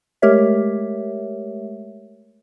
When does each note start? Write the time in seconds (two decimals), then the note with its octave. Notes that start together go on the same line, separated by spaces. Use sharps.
0.22 G#3 A3 G4 A#4 C#5 E5